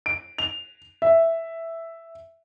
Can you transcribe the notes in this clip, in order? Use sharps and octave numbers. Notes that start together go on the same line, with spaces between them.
D7
F7
E5